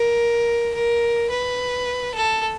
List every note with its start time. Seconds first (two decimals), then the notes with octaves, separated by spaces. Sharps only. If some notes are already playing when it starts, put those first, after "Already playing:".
Already playing: A#4
0.74 A#4
1.30 B4
2.14 A4